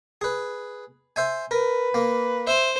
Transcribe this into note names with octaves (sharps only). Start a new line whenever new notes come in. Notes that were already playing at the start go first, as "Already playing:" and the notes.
G#4 B4
C5 E5 G#5
A#4 B4
A#3
C5 E5